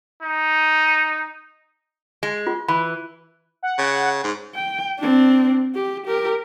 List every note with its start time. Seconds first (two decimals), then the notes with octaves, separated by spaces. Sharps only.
0.23 D#4
2.23 G#3
2.47 F4
2.68 E3 B5
3.63 F#5
3.78 C#3
4.24 G#2
4.55 G5
4.99 C4 D4
5.75 G4
6.07 G4 A#4